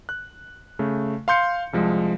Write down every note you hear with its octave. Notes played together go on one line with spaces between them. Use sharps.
F#6
C#3 A3
F5 C6 G6 C#7
C2 F3 G#3